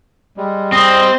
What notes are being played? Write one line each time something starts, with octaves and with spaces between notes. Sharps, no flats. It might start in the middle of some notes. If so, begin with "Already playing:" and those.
G3 G#3
C4 D#5